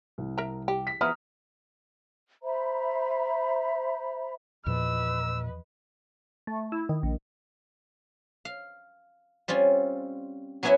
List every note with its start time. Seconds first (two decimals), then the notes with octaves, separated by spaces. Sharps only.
0.18 C2
0.38 A#4 E5 A#5
0.68 G4
0.87 B6
1.01 F3 B3 E4 A#5 D#6 F6
2.43 C5 E5 A#5 B5
4.66 E2 A#2 F3 B4 D#5 E6
6.47 A3
6.72 E4
6.89 D#3
7.03 A#1
8.45 F5
9.48 G3 C4 C#4 F4
10.63 F#3 B3 C#4 E4 F#4 E5